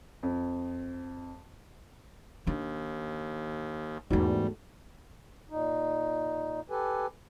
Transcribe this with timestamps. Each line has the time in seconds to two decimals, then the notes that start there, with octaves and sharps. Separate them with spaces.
0.23 F2
2.47 D#2 D4 D#4
4.10 E2 G#2 E3 G3 A3 F#4
5.50 A#2 D#4
6.70 G4 A4 B4 G#5